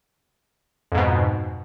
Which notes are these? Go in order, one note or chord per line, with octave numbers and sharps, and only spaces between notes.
F2 G#2 B2